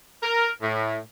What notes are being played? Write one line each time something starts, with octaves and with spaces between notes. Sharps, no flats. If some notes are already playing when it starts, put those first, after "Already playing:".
A#4
A2